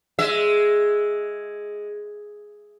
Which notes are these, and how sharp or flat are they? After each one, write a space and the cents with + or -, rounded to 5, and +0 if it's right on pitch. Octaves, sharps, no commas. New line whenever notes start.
G#3 +0 E5 +0